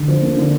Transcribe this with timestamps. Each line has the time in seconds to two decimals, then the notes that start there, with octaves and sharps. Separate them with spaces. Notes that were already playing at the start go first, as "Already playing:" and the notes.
Already playing: D3
0.08 F3
0.22 A#3
0.37 D3